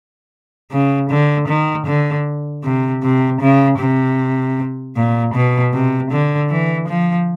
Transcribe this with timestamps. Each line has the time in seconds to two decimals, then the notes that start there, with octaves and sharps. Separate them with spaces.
0.71 C#3
1.10 D3
1.48 D#3
1.86 D3
2.63 C3
3.02 C3
3.41 C#3
3.79 C3
4.96 A#2
5.34 B2
5.73 C3
6.11 D3
6.50 E3
6.88 F3